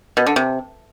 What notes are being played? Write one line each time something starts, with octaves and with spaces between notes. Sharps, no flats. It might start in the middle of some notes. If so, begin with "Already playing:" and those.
B2
D3
C3